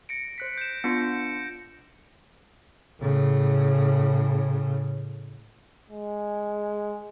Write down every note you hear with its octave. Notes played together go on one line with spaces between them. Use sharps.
A#6 C#7 D7
C5 F#6 B6
G6 E7
B3 D4 F4 A#6 C#7
A2 C#3
G#3